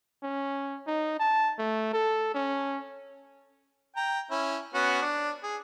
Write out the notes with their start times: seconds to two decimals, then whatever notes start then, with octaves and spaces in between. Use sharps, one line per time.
0.23 C#4
0.87 D#4
1.20 A5
1.59 A3
1.93 A4
2.35 C#4
3.96 G5 A#5
4.31 C#4 E4
4.74 B3 C#4 F#4
5.02 D4
5.43 G#4